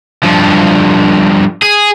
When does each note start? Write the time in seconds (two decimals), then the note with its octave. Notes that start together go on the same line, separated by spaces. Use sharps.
0.23 G2 F3
1.62 G#4